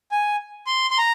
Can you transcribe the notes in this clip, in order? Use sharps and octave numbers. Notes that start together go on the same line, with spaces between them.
G#5
C6
C6
A#5